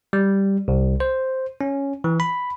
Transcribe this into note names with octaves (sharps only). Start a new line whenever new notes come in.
G3
C2
C5
C#4
E3
B5